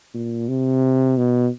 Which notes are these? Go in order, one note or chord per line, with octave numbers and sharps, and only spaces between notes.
A#2
C3
B2